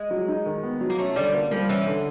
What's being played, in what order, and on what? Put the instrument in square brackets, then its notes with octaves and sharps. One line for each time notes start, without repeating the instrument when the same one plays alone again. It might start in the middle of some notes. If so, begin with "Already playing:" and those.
Already playing: [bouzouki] G#3
[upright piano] F#3
D#4
D#3
B3
F#3
[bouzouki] A#3
[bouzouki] A3 [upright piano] C#4
[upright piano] D3 [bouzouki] G3
[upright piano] A#3
[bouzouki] F3 [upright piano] G3
[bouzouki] E3 [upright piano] C#4
[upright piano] D3